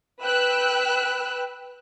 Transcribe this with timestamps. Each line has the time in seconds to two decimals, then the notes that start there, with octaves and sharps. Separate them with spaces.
0.21 B4 G5 E6 F#6